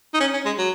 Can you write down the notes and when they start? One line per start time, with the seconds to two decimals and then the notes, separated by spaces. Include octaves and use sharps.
0.14 D#4
0.20 C#4
0.33 C#4
0.46 G#3
0.58 F#3